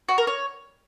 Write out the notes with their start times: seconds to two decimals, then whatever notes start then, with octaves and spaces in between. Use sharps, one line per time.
0.09 F#4
0.18 A#4
0.27 C#5